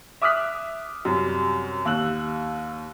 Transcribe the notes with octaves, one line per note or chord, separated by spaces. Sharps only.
E5 D6 D#6 F6 F#6 B6
F#2 C3 G3
D#2 E6 F#6 F#7